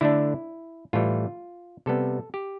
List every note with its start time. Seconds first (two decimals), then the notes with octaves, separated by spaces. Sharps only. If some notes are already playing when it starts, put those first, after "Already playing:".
0.01 D3 A3 D4 E4
0.93 A2 E3 G3 F4
1.86 C3 G3 B3 A4
2.34 G4